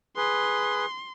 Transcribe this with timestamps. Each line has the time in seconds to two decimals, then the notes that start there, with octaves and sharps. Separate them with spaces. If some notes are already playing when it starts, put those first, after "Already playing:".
0.17 G#4 B4 C6